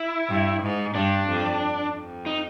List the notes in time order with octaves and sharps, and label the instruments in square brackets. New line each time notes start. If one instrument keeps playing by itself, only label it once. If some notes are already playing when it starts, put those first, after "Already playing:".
Already playing: [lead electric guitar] E4
[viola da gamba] G2
G#2
[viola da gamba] G2 [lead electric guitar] D4
[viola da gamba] F2
F2
[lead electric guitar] D#4